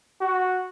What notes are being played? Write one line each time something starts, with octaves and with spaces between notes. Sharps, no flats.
F#4